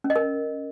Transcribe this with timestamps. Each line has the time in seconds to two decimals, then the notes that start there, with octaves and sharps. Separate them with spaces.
0.04 C#4
0.10 D#5
0.16 A#4